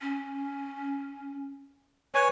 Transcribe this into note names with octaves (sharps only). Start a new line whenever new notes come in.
C#4
B4 C#5 G#5